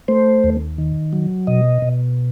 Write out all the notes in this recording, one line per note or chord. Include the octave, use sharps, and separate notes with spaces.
A3 C5
D#2
D#3
F#3
B2 D#5
B2